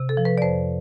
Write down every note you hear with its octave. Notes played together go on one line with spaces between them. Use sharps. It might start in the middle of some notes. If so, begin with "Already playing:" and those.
Already playing: C3
A4
F3
B4
D5
F2 C5